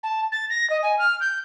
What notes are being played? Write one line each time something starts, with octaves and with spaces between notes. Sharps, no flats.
A5
A6
A#6
D#5
G#5
F6
G6